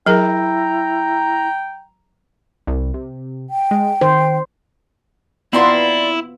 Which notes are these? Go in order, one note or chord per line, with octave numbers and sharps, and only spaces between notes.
F#3 E4 G#4 A#4 G5 A#5
C2
C3
G5
G#3
D#3 C5
B3 C4 E4 F4 D5 A#5 C6